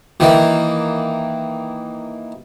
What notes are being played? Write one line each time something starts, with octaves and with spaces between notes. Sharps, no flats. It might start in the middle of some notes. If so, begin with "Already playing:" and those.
D#3 E3 A#3